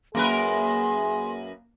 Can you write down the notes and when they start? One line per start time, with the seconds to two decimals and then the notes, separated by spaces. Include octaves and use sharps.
0.15 F#2 A#3 G#4 A#4 B4 C6